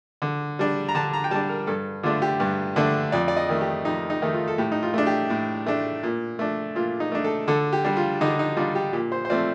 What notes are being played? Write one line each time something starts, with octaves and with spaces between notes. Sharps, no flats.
D3
G3 D4
A#5
D3 A5
A#5
G5
G3 D4 A5
A#4
G2 A4
D3 A3 D4 F4
G4
G2
D3 A3 D4
F2 D5
D5
D#5
D#3 A3
G4
F2 D#4
D#4
D#3 A3
F4
A4
A2 G4
D#4
F4
A3 D4
G4
A2
A3 D4
A#2
A3 D4
A#2 F4
D#4
A3 D4
A4
D3 A4
G4
G3 D4
F4
D3 D#4
D#4
G3 D4 F4
G4
A#2 G4
C5
C5
F3 A3 C4 D5